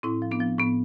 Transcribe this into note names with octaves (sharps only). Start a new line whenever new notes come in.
A2 C4 E4
F3
B3 D4
F3
A2 B3